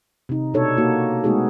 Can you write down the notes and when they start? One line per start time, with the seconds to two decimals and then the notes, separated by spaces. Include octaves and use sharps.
0.29 C3 D#4
0.54 B2 D4 D#4 A4 C#5
0.78 A#3 D#4 F#4
1.24 G#3 A3 B3 D#4 F#4 G#4